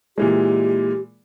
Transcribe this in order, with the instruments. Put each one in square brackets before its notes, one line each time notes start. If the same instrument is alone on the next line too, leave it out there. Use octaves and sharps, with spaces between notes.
[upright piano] A#2 E3 G#3 [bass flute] G4